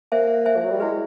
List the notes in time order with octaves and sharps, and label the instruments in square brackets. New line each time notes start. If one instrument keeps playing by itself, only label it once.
[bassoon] A#3 [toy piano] C5 E5 G#5
[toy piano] C5 E5 G#5
[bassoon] F3
F#3
G3
[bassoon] G#3 [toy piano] E4 G#4 B4